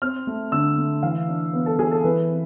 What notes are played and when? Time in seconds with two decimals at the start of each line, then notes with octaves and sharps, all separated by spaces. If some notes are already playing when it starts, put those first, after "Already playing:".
0.02 C4 F6
0.27 A3
0.52 D3 E6
0.78 A3
1.03 E3 F5
1.28 D4
1.53 B3
1.66 A4
1.79 E3 G#4
1.91 A4
2.04 E3 B4
2.29 C4